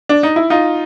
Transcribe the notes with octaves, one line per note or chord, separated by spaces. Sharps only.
D4
D#4
E4
D#4 F4